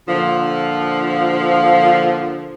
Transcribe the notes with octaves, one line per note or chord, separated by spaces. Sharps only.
A#2 D3 F3